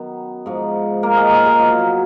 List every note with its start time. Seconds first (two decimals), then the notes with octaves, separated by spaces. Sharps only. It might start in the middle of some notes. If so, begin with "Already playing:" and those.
Already playing: F#2 D#3 F#3 B3
0.46 G#2 F3
1.03 A#3 A#4
1.17 G#3 G#4
1.31 A#3 A#4
1.46 G#3 G#4
1.59 B2 F3 F#3 F4
1.79 F#3 F#4